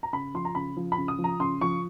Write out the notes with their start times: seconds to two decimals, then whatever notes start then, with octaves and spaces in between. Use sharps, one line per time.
0.03 A#5
0.13 C#3 B5
0.34 F3 C6
0.45 A#5
0.55 C#3 B5
0.77 F3
0.92 B5
0.98 C#3
1.08 D#6
1.18 F3
1.24 A#5
1.40 C#3 C6
1.61 F3 C#6